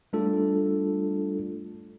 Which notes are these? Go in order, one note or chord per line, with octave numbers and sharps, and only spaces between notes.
G3 A3 D4 F4 A4